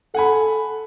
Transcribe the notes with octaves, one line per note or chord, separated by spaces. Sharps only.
A4 F#5 G#5 B5